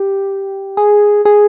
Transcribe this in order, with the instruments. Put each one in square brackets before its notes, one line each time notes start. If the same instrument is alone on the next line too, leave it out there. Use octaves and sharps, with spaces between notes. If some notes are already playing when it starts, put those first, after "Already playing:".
Already playing: [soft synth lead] G4
G#4
G#4